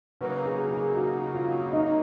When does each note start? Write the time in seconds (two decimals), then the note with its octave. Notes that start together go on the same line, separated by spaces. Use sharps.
0.21 C#3 F#3 A#3 D#4 B4
0.45 G#4
0.71 G#4
0.97 F#4
1.34 F4
1.73 D#4